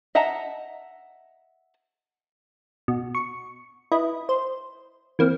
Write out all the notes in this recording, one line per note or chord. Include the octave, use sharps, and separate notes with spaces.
D#5 E5 F#5 A5 A#5
B2
C#6
E4 B4 D#5
C5
E3 A#3 C4